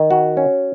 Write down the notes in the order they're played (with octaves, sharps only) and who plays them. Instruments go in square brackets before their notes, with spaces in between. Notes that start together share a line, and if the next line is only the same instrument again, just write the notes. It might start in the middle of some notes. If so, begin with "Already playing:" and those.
Already playing: [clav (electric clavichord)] D#3
F#4
C#4